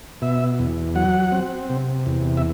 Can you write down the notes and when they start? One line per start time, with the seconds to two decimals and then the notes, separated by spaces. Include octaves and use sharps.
0.22 B2 E5
0.59 E2
0.96 F#3 F#5
1.32 C4
1.70 C3
2.06 E2
2.37 E5